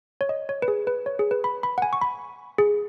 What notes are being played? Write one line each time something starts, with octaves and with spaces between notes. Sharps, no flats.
C#5
D#5
C#5
B4
G#4
B4
C#5
G#4
B4
B5
B5
F#5
G#5
C#6
B5
G#4